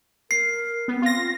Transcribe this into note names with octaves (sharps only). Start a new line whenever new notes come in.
A#4 C7
B3 C4
F4 A#6